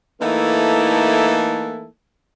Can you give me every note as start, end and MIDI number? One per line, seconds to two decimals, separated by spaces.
0.21 1.87 52
0.21 1.87 57
0.21 1.87 58
0.21 1.87 63
0.21 1.87 64
0.21 1.87 69